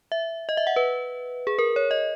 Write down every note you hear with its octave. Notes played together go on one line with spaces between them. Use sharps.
E5
D#5
E5
F#5
B4
G#4
A#4
C#5
D#5